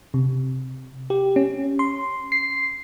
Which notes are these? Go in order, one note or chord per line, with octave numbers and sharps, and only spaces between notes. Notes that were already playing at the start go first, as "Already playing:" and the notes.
C3
G4
C#4
C6
C7